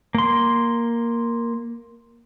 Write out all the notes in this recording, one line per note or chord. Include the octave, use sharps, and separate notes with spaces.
A#3 C6